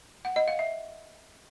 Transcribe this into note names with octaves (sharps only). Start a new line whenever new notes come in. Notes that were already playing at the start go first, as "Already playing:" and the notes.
F#5
D#5
F5
E5